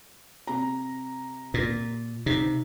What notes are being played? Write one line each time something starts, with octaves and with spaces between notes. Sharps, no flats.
C3 A#5
A#2
C3 D#4